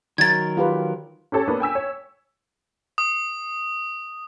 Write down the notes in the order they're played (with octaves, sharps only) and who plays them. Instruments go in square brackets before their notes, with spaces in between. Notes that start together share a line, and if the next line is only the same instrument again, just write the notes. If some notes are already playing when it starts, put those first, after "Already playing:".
[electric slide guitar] D#3 F#3 A#4 [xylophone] G#6 A6
[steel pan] F4 G4 B4
[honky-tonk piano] C#4 G4 A4 C#5
A#3 B3 D4 A4
G5 G#5 E6 B6
C#5
[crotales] D#6